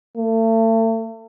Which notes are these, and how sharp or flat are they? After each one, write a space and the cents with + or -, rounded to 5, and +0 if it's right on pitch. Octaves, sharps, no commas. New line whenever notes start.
A3 +40